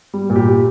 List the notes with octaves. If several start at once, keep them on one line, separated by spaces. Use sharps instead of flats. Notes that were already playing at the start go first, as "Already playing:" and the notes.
G3
A#2
G4